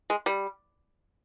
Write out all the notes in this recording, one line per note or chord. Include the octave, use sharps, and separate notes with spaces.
G#3
G3